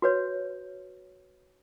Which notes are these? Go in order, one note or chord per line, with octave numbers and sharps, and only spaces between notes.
F#4 B4 C#5